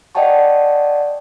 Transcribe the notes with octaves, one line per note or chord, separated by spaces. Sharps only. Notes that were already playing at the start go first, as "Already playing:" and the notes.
D5 D#5 F#5 G5 A5 C#6